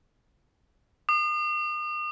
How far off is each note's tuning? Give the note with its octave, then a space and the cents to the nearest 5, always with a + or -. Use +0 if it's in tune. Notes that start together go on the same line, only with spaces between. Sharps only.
D#6 -40